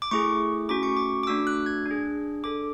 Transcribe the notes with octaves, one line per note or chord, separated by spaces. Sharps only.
D6
A3 E4 G#4 C#6
A3 C#4 F#4 D6
C#6
D6
D6
A3 D4 F#4 E6
F#6
G#6
D4 G#4
D4 A4 D6